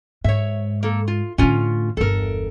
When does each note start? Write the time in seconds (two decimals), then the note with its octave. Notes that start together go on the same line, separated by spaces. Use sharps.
0.24 G#2 C#5 E5
0.83 A#3 A4
1.08 F4
1.38 A2 D3 C#4 F4
1.97 G1 E2 A4 A#4